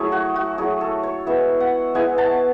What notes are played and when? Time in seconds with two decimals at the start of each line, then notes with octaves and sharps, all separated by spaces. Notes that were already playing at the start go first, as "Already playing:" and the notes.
Already playing: F#3 A3 E4 G#4
0.12 F#4
0.36 F#4
0.58 F#3 A3 E4 G#4
0.81 A4
1.03 C#5
1.26 G#3 B3 E4 E5
1.60 F#5
1.94 G#3 B3 E4 G#5
2.18 A5